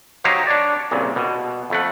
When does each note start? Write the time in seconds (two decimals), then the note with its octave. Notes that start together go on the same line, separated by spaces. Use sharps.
0.24 F#3 D#4 G4 C5 C#5 F5
0.47 D4 C#5 D5
0.91 C2 A#2 C#3
1.16 B2
1.70 F2 A3 F#5